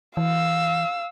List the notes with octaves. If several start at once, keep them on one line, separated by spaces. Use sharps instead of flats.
E3 F5 E6